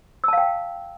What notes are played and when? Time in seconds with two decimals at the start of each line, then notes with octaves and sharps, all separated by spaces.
0.24 E6
0.28 A5
0.33 F5
0.37 G5